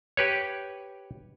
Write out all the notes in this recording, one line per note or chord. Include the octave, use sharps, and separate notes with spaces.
G4 B4 C#5